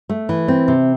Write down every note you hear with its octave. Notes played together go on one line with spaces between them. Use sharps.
A3
E3
C4
C3